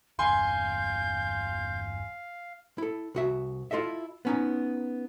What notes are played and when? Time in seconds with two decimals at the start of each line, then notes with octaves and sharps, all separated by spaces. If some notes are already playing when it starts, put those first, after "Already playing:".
0.19 G1 E2 F5 G#5 C6 G6
2.78 E4 A4
3.15 C2 F#4 E5
3.71 E4 F4 A4 D#5 E5
4.25 B3 C#4 D#4